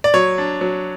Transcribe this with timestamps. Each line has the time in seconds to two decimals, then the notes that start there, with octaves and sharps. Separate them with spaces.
0.04 D5
0.14 F#3 C#5
0.38 D4
0.61 F#3